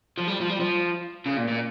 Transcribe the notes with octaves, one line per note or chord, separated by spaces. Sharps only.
F3
G3
F3
G3
F3
C#3
A#2
A#2